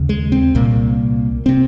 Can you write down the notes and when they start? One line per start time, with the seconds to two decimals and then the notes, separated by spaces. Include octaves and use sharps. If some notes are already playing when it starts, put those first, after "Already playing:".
Already playing: D#2 C#3
0.09 G#3
0.32 C4
0.55 C2 A#2 A#3
1.46 C3 C4